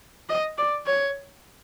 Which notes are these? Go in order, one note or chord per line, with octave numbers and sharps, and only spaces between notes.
D#5
D5
C#5